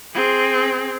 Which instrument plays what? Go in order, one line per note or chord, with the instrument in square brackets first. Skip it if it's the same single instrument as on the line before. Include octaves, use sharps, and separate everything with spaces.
[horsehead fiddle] C4 G#4